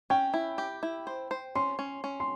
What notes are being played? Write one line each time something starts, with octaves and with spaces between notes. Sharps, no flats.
C#4 G5
E4
G4
E4
C5
C5
C#4 C6
C#4
C#4
C6